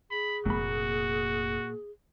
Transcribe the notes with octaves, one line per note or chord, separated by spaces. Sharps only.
G#4 B5
F1 A#2 A#3 F#4 B5